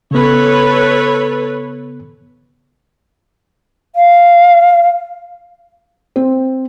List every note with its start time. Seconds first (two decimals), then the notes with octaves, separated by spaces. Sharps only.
0.11 C#3 B3 A4 B4 C#5
3.96 F5
6.16 C4